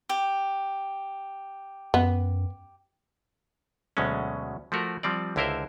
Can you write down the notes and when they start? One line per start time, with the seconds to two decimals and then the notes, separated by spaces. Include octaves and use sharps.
0.09 G4
1.94 F#2 B3
3.97 D2 B2 F#3 G#3 C#4
4.72 F3 A3 F#4 A#4
5.03 F3 G3 C4 D5
5.36 C#2 D3 E4 A#4 C5 E5